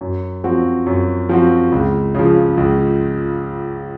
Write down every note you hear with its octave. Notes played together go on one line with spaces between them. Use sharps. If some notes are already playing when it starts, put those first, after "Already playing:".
F#2
F3 C4 F#4
F#2
F3 C4 F#4
C#2
C#3 F3
C#2